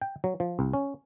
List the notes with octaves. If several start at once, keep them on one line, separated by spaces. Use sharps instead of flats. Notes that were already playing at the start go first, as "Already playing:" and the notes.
G5
F#3
F3
C2
C#4